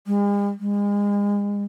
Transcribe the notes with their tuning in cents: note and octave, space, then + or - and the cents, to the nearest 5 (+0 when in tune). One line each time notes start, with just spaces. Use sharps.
G#3 -45
G#3 -35